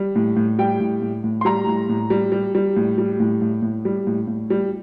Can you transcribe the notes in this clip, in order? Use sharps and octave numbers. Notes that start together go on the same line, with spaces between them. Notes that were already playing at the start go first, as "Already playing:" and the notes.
Already playing: G3
A2
A2
G3 G5
A2
A2
A2
C6
G3 A#5
A2
A2
G3
G3
G3
A2
G3
A2
A2
A2
G3
A2
A2
G3